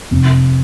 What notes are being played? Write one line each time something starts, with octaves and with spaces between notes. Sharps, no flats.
F1